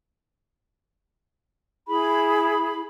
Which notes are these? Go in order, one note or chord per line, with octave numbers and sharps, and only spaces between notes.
E4 G#4 B5